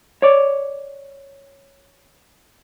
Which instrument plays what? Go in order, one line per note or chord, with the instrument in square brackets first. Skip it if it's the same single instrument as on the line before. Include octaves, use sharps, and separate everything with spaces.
[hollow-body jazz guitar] C#5 D5